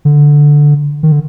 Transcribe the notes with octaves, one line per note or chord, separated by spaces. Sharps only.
D3
D#3
D3